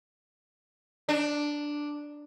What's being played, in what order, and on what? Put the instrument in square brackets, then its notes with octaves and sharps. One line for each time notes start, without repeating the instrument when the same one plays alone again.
[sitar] D4